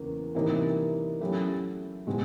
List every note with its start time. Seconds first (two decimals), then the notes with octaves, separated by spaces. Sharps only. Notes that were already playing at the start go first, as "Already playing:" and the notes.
Already playing: E2 C#3 A#3
0.35 C3 E3 G3 A#3 D#4
1.21 F#3 A3 C#4 E4 G4
2.07 B2 G#3 C4